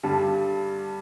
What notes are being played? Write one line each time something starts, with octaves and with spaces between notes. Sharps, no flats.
G2 D3 G3 A5